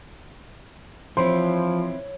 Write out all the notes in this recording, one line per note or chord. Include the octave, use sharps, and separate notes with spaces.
E3 F3 C4 E4 C5 C#5 C6